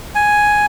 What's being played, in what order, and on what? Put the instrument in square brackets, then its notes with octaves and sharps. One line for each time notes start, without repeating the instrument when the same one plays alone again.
[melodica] G#5